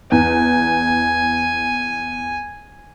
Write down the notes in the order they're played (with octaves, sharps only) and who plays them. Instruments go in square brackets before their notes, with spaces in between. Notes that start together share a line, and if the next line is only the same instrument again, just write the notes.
[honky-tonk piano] E2 [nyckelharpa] G#5